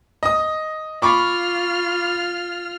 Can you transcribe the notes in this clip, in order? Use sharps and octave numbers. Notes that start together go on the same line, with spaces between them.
D#5 D#6
F4 B5 C#6 D6 F6